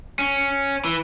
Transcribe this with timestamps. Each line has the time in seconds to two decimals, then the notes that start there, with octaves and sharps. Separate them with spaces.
0.19 C#4
0.85 E3